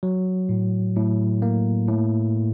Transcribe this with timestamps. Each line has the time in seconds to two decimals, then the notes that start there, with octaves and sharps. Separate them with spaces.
0.03 F#3
0.49 A2
0.96 A2
1.42 A#3
1.88 A2